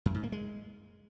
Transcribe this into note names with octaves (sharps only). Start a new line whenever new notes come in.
F#2
G#2
A#3
G#3